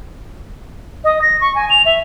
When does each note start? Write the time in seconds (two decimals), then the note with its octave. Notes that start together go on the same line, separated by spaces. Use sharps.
1.04 D#5
1.22 A#6
1.41 C#6
1.55 G#5
1.70 F7
1.85 E5